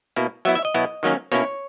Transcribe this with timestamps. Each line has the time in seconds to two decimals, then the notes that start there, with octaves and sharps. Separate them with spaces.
0.16 B2 A#3 E4
0.45 F#3 B3 E4 E5
0.55 E5
0.65 D#5
0.74 B2 F#3 B3 E4
1.03 D#3 F#3 A#3 C#4
1.32 B2 A#3 C#4 E4 C#5